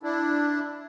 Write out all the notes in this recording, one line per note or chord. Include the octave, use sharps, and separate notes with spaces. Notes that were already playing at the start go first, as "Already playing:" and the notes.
D4 E4